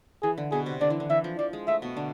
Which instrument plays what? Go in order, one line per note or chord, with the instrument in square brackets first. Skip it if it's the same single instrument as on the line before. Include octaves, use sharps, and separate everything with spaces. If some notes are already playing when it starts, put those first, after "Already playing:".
[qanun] E3 [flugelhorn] G#4
[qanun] D3
[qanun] B2 B3 [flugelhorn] G#4
[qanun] C3 C4
[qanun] D3 D4 [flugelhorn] D5
[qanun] E3
D3
[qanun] E3 [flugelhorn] E5
[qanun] F3
[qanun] F3 [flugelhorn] D5
[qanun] G#3
[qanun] A3 [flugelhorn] E5
[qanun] B2 B3
D3 D4